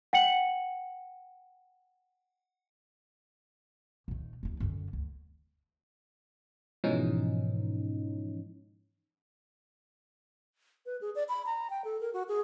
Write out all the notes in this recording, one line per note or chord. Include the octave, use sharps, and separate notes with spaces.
F#5 G5 C#7 F#7
D#1 D#3
D#2 D#4
F#2 D3
D2
G#2 B2 E3 F3 C#4 D#4
B4
G#4
D5
B5
A#5
G5
A4
A#4
F#4
G#4